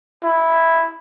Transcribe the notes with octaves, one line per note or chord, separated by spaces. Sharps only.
E4